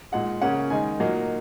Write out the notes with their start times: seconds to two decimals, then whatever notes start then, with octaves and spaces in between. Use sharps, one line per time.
0.12 A#2 G#3 D#4 F#5
0.42 C#3 A#3 C#4 F#5
0.70 D#3 G#3 D#4 G#5
1.00 A#2 F#3 A#3 D#4